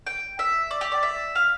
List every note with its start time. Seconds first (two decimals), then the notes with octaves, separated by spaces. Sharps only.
0.07 G5
0.39 E5
0.71 D5
0.81 G4
0.92 D5
1.03 E5
1.35 F5